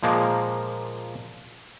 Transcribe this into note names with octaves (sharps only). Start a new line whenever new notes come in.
A#2 F3 G#3 A#3